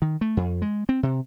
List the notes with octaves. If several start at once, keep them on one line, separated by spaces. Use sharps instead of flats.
D#3
A3
F2
G#3
C4
C3